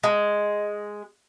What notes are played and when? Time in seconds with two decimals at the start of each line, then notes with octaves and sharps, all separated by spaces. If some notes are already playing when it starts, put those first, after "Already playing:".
0.03 G#3